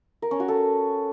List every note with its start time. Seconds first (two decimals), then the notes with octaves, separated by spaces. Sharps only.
0.22 A#4
0.31 C#4
0.40 F#4
0.48 A4